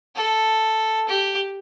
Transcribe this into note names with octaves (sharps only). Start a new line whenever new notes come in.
A4
G4